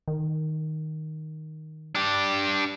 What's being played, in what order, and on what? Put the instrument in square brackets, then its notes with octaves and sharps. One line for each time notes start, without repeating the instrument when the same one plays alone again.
[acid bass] D#3
[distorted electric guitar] D4 G4